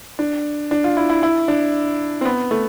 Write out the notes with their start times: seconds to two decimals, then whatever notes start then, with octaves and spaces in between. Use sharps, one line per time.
0.19 D4
0.71 D4
0.84 F4
0.97 E4
1.09 E4
1.23 E4
1.48 D4
2.21 C4
2.25 B3
2.51 A3